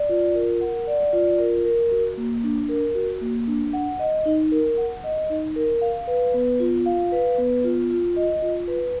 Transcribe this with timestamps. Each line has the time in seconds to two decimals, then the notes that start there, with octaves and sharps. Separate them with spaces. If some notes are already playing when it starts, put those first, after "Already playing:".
Already playing: D5
0.09 F4
0.35 A#4
0.61 F#5
0.87 D5
1.13 F4
1.39 A#4
1.65 A#4
1.91 F#4
2.17 A#3
2.44 D4
2.69 A#4
2.95 F#4
3.21 A#3
3.47 D4
3.73 F#5
3.99 D#5
4.26 D#4
4.52 A#4
4.78 F#5
5.04 D#5
5.30 D#4
5.56 A#4
5.82 F5
6.07 B4
6.34 B3
6.60 F4
6.86 F5
7.12 B4
7.38 B3
7.64 F4
7.90 F4
8.17 D#5
8.42 F4
8.68 B4